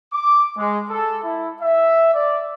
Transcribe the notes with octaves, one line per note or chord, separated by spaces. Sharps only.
D6
G#3
A4
E4
E5
D5